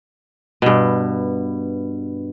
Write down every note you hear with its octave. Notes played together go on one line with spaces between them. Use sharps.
G2 B2